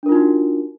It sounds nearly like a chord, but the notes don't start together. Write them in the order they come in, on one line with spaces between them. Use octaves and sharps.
D4 A#4 F4 D#4 F#4